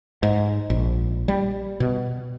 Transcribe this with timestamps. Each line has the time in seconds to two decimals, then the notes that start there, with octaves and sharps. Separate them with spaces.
0.23 G#2
0.70 A#1
1.28 G3
1.80 B2